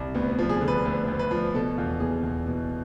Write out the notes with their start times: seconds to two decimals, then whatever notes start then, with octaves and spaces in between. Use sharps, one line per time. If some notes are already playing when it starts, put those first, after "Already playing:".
Already playing: C2
0.15 D2 B3
0.32 B3
0.39 F3
0.49 G#4
0.61 D3
0.68 B4
0.85 D2 B4
1.08 D2
1.19 B4
1.31 F3
1.54 B2 A4
1.77 E2 F4
2.00 B2 G#4
2.23 E2
2.47 B2